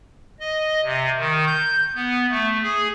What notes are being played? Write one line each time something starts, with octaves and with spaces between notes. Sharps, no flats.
D#5
C3
D#3
G6
B3
A3
G#4